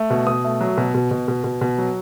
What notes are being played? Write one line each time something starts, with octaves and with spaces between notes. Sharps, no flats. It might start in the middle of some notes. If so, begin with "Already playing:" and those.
Already playing: A3
B2
B2 D#6
A3
F#3
B2
B2
B2
B2
B2
B2
F#3